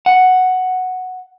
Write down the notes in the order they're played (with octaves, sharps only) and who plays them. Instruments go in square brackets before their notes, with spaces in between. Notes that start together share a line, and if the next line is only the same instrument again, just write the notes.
[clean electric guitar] F#5